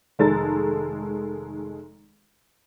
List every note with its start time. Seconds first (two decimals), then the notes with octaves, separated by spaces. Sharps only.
0.19 F1 D#3 G#3 A4 A#5 A6